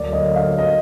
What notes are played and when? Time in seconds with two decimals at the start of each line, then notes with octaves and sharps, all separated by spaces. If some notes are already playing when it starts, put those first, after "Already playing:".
Already playing: D2 D3 F#3 A#3 D5
0.13 D#5
0.36 F5
0.58 D#5